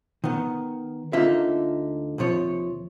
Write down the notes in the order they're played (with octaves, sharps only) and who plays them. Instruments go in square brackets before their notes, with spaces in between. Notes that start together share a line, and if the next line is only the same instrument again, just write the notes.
[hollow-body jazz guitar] D#3 B3
D2 D3 A#3 D#4 F4 E5
D#2 C3 F3 C#5